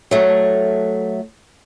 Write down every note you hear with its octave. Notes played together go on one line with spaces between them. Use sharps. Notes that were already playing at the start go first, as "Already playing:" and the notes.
F#3 A3